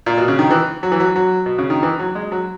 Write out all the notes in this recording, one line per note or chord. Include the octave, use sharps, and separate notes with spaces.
A#2
B2
C#3
D#3
E3
F#3
E3
F#3
F#3
B2
C#3
D#3
E3
F#3
G#3
F#3